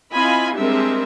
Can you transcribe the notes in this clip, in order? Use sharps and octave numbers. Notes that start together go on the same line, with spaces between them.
C4 E4 F4 D#5 G#5 B5
G3 G#3 C4 D4 A#4 E5